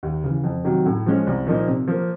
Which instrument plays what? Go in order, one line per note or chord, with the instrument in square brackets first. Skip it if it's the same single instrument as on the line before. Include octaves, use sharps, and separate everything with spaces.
[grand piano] D#2
C#3 E3
F2
C3 D#3 F#3
A2
F3 G#3 C#4
C2
A#2 F3 A#3 D#4
C3
F3 A#3